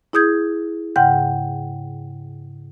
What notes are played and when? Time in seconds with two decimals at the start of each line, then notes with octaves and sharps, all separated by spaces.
0.13 E4 G#4 D#6 G6 G#6
0.96 G#2 C#3 F#5 G5 G6